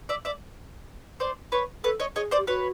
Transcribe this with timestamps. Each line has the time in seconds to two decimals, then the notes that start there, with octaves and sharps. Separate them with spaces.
0.09 D5 E5
0.25 D5 E5
1.20 C5 D5
1.52 B4 C#5
1.84 A4 B4 C#5
2.00 C#5 D#5
2.16 G#4 C#5 D#5
2.31 C5 D5
2.38 G4
2.47 F#4 B4 C#5